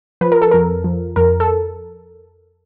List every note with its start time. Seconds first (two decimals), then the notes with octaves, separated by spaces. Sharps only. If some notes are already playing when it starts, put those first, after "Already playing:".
0.21 F3 B4
0.32 A#4
0.42 A4
0.51 F2 A#4
0.84 F3
1.16 F2 A#4
1.40 A4